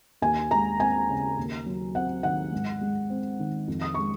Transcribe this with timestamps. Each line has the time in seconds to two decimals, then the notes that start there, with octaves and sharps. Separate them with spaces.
0.22 D#2 G#5
0.51 G#3 A#5
0.79 C4 G#5
1.09 C#3
1.37 D#2
1.66 F#3
1.95 C4 F#5
2.23 D#3 F#5
2.52 G#2
2.81 G#3
3.10 C4
3.39 D#3
3.68 F2
3.82 D#6
3.94 G#3 C#6